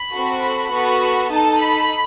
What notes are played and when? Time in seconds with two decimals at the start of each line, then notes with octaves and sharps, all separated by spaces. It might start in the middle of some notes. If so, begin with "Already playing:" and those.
Already playing: B5
0.12 C4 F#4 A4
0.40 B5
0.70 B3 F#4 A4
1.30 D#4 A4 A5
1.59 B5